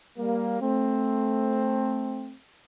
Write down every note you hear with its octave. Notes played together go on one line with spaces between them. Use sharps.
G3 A#3
A3 C4